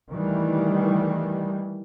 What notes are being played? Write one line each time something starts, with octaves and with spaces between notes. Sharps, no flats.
D#3 E3 G3 A3